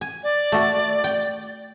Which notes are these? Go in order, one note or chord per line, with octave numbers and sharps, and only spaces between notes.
G#5
D5
A3 F#4
G5